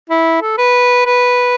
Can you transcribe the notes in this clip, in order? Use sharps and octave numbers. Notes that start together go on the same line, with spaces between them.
E4
A4
B4
B4